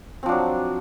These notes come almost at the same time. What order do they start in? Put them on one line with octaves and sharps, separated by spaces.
C4 F3 D4 F#3